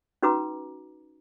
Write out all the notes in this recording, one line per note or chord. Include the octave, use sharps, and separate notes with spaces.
C#4 D#4 F#4 B4 A#5 D6